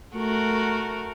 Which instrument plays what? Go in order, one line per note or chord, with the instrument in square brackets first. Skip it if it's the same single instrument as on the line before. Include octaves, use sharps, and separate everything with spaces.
[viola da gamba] A3 F#4 A#4